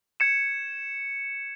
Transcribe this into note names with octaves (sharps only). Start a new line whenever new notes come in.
G#6 C#7 E7